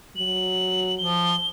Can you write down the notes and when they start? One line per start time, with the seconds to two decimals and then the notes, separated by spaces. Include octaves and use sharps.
0.16 F#3 F#7
0.98 F3 G7